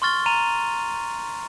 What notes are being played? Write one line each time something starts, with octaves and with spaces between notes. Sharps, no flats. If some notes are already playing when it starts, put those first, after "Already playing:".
C6 C#6 F6 A6 G7
A#5 D#7 F7